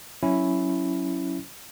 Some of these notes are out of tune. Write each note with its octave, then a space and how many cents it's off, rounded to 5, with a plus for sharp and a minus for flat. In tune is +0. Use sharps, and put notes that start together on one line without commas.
F#3 +0 C#4 +0 E4 +0